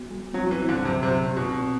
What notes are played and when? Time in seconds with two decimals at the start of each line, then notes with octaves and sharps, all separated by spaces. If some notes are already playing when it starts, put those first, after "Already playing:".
Already playing: B3 F#4
0.11 G3
0.34 F#3 C4
0.51 E3
0.57 C5
0.69 D3
0.80 F#3
0.85 C3
1.03 C3 G4
1.26 C4
1.37 B2
1.48 C4